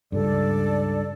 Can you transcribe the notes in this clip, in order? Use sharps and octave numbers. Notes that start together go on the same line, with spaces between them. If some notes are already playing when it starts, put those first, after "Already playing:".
C#2 G2 A4 D5